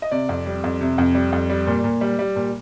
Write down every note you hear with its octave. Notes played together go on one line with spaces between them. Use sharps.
D#5
C3 D5
F2
G3
F2
C3
F2
G3
F2
G3
A#2
A#2
G3
G3
A#2